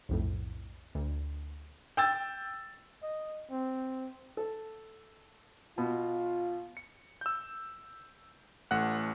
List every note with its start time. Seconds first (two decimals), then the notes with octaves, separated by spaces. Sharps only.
0.09 B1 F2 A2
0.95 D2
1.97 G5 E6 A6
3.03 D#5
3.51 C4
4.37 A4
5.78 B2 F4
6.77 C#7
7.21 E6 G6
8.71 A1 A3 F#5 F#6